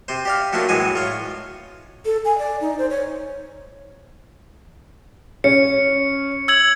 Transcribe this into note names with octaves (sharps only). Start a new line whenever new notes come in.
C3 C5
G4 D5 F5
F#3 A3 A#3 D4 F4
A2 E3 F#3 G#3 G#5
F4 C#5
A4
G#5
D5
D#4
C5
C#5
C#4 C#7
E6 G#6 F#7